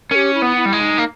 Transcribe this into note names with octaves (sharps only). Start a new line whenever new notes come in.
C#4 G4 A#4
E4
B3
E4
G3
G#3
D#4
A#3